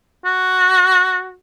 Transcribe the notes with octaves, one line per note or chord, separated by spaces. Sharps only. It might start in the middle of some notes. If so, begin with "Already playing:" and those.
F#4